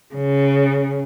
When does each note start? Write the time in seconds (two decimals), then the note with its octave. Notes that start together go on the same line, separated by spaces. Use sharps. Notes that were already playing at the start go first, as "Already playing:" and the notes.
0.15 C#3